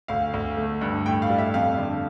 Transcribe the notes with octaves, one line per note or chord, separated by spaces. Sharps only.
D2 F5
D2
A3
G2
A2 G5
F5
G3
E5
F2 F5
D3